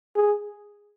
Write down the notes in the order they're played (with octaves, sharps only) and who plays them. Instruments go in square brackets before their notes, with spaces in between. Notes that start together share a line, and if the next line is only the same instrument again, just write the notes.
[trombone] G#4